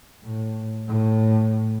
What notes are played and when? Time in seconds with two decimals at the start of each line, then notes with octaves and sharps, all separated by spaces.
0.24 A2
0.88 A2